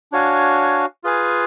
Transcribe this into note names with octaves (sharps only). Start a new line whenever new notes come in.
D4 F#4 C#5 F5 G#5
F4 G#4 B4 F5 G#5